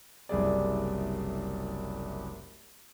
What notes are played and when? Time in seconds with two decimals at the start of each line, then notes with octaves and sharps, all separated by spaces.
0.29 F#1 C2 G#4 D5